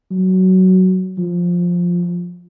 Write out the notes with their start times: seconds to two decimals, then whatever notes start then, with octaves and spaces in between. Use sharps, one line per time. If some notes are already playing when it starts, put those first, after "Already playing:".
0.11 F#3
1.18 F3